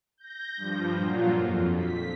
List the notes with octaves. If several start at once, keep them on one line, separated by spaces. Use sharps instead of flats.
G6 A#6
G2 F3
A#2 F#3 F4
F2
B6